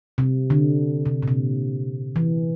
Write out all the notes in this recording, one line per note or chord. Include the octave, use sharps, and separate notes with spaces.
C3
D3
C3
A#2
C3
E3